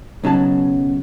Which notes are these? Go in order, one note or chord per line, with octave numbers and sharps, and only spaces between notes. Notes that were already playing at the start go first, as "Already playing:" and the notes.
B1 C#3 F#3 A5